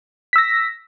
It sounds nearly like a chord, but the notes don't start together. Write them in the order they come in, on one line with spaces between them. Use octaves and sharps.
B6 E6 A#6